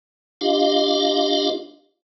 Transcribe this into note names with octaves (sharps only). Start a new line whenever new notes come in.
D4 F4 G4 D#5 F5